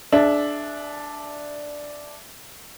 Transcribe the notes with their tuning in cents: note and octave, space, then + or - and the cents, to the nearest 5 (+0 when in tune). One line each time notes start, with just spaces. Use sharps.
D4 +0 G#4 +40 E5 +5